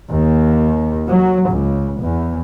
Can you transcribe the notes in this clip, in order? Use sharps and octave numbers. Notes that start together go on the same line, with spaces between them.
D#2
F#3
C#2
E2